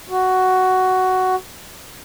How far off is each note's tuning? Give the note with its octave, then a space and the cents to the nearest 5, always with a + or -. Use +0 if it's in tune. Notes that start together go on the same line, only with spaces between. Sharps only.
F#4 +10